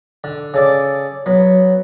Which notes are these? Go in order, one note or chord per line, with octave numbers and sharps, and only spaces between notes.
D3
C#3 A4 D5
F#3 B3